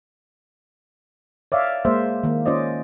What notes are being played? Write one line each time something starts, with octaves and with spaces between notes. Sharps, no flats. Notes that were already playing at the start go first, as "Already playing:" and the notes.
C#5 D5 E5 F5
G#3 A#3 C5 E5
D#3 A#3
C#4 F4 C5 D5 D#5